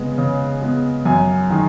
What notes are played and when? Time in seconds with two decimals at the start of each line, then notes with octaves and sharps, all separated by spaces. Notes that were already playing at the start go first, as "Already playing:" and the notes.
Already playing: C#3 G#3 B3
0.18 C#3
0.62 G#3 B3
1.05 F#2 G#5
1.50 D#3 G#3